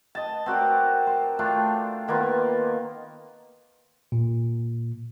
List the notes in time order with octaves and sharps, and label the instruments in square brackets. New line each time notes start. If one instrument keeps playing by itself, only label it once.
[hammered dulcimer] D#5 A5
C4 F#4 A#4 D5
C5
A3 D4 F4 G5
D#3 A#3 B3 F4
[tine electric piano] A#2